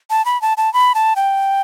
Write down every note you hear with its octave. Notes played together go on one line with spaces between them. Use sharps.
A5
B5
A5
A5
B5
A5
G5